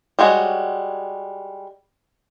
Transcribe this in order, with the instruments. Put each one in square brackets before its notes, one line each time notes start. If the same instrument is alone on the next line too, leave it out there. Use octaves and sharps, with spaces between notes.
[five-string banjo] G3 G#3 F#4 C#5